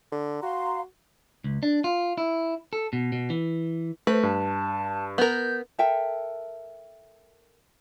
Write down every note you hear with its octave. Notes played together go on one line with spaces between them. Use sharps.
D3
F#4 F5 A#5 C6
C#2
D4
F4
E4
A4
B2
B2
E3
A3 B4 C5
G2 A5
B3 A#4 G6
A4 A#4 E5 G5